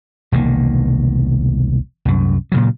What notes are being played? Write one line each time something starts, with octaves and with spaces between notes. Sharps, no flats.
E1 C2 D#3 A#3
C2 F#2
A#2 C#3 F#3